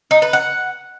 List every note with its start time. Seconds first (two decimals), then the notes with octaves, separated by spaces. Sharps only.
0.11 D#4
0.22 B4
0.33 F#5